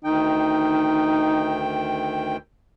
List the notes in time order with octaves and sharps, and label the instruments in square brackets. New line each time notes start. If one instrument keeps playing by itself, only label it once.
[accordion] D2 D#3 G5 [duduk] D#4